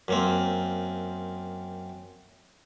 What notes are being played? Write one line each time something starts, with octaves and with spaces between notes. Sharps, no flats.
F#2 A#3 C4